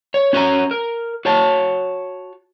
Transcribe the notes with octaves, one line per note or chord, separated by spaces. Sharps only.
C#5
C#4 F#4 C#5 E5 G#5 A#5
A#4
F#4 C#5 A5